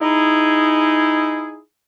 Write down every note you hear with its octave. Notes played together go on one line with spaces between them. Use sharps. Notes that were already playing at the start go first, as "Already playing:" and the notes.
D#4 E4 G#4